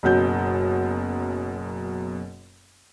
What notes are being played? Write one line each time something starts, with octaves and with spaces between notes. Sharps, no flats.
F#1 F#2 B2 G6